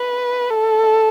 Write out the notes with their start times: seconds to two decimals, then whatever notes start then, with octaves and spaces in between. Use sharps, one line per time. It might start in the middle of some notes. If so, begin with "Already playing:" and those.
Already playing: B4
0.50 A4